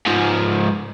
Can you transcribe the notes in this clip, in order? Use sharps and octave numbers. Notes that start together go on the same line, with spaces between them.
G#2 F3